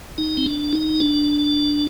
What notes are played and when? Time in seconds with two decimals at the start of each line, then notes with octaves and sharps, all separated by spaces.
0.18 D#4
0.37 C4
0.46 D4
0.73 D#4
1.00 D4